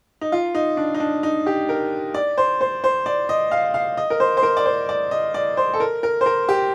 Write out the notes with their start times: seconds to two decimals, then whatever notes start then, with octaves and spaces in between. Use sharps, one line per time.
0.21 D#4
0.32 F4
0.55 D#4
0.77 D4
0.94 D#4
1.00 D4
1.23 D#4
1.46 G4
1.69 A#4
2.14 D5
2.38 C5
2.61 C5
2.84 C5
3.06 D5
3.29 D#5
3.51 F5
3.74 F5
3.97 D#5
4.10 A#4
4.20 C5
4.37 C5
4.43 A#4
4.57 D5
4.66 C5
4.89 D5
5.11 D#5
5.34 D5
5.57 C5
5.74 A4
5.80 A#4
6.03 A#4
6.21 C5
6.26 A#4
6.49 G4